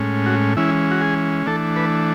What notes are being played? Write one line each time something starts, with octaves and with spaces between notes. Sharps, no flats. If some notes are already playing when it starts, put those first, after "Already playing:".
Already playing: A2 G#3 C#4
F#4
E3 G#3 C#4 E4
F#4
G#4
E3 A3 D4 A4
B4